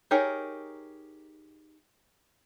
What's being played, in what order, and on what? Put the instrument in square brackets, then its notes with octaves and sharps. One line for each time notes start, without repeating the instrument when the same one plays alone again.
[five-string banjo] D#4 G4 G#4 A#4 C#5